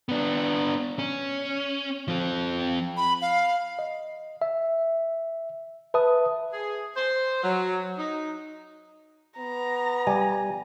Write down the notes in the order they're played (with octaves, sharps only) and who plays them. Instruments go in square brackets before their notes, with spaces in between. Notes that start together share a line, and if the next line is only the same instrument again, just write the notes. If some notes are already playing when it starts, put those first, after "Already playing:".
[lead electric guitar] B3 D4
C#4
F3 C4
[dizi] B5
F5
[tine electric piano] D#5
E5
B4 E5 A5 D#6
[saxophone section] G#4
C5
F#3
D#4
[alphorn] B3 [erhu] A#5
[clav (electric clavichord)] G3 [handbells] G#5